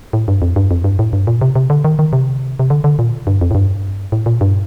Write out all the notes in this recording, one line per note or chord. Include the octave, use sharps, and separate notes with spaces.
A2
G2
F2
G2
F2
G2
A2
G2
A#2
C3
C3
D3
D#3
D#3
C3
C3
D3
D3
A#2
G2
F2
A2
G2
A2
A#2
G2